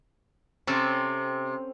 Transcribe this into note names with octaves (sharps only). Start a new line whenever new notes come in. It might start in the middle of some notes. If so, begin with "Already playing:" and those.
C3 C4 C#4 A4